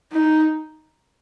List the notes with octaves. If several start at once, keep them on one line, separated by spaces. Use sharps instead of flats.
D#4